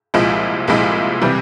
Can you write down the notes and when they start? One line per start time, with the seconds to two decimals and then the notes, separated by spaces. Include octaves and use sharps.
0.14 C2 A#2 F3 G#3 E4
0.68 C2 A#2 F3 G#3 E4
1.22 C3 E3 G3